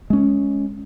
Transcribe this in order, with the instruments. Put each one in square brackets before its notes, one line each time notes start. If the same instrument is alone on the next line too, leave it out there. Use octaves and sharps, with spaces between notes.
[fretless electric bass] G#3 C#4